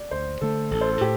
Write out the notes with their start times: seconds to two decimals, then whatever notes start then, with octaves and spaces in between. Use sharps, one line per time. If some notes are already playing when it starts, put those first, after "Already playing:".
Already playing: D5
0.11 D2 C5
0.41 D3 A3 A4
0.71 A1 A4
0.81 C5
0.91 A4
1.01 A2 G4